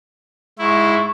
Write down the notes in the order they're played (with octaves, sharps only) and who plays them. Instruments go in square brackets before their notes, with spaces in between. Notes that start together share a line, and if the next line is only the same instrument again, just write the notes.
[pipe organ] G#2 E4 [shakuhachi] C#6